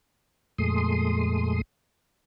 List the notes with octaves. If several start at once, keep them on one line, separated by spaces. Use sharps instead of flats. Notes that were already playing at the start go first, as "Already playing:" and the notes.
F2 A#2 G#3 A3 C6 D#6